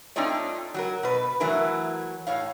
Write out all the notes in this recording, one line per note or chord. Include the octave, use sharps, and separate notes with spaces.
A3 C4 D4 D#4 F4 C#5
F#3 F#4 A#4
B2 B4
E3 F#3 A3 E4 A#4
A2 C#5 F5